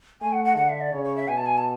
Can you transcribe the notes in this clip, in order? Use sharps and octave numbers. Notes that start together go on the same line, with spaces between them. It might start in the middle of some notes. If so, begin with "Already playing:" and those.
A3 G#5
F#5
F#5
D3 F#5
E5
D5
C#3 C#5
C#5
E5
B2 G#5
A5
G#5
A5